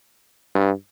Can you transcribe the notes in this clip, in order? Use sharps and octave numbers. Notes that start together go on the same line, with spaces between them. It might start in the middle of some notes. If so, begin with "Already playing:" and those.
G2